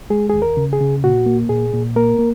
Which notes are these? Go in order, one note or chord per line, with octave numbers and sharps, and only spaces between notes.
G#3 G#4
D#2 G#4
A#4
C#3
G#4
C#3
A#2 F#4
A#3
A#2 G#4
A#2
A#3 A#4
A#3